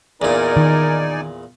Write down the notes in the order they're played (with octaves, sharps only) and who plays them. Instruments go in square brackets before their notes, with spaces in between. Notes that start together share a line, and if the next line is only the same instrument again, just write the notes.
[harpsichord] E2 A#2 [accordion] D#4 D5 G#5 [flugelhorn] A#4
[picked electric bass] D#3